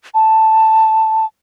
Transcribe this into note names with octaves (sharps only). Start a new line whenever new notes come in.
A5